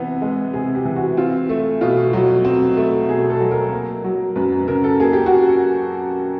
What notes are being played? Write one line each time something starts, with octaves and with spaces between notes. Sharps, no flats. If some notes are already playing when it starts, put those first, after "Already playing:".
Already playing: C3 E3 B3
G#3
C3 G#4
G4
E3
F#4
C4 F4
A3
B2 F4
F#3
C4
A3
B2 G#4
A4
F#3
A#4
A#3
F#3
F#2 B4
C#3 A#4
A4
A#3 G#4
G4
F#4